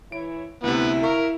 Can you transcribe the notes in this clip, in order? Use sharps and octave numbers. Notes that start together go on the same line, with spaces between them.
E3 E4 C#5 D7
D2 C3 B3 E4
A#4 E5 F5 C#6